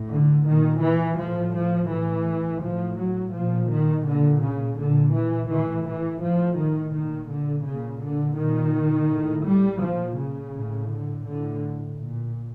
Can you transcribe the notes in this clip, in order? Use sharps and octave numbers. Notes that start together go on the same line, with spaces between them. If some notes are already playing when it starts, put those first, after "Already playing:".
Already playing: A2
D3
A#2 D#3
E3
A2 F3
F3
A2 E3
A2 F3
F#3
A#2 F3
D#3
A#2 D3
C#3
A#2 D3
E3
A2 E3
E3
A2 F3
D#3
A#2 D#3
D3
A#2 C#3
D3
A#2 D#3
A2
G3
A#2 F3
C#3
A2
D3
A2 D3
A#2